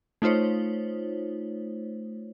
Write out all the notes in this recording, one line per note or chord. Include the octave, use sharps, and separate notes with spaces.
A3 D#4 F4 C5 C#5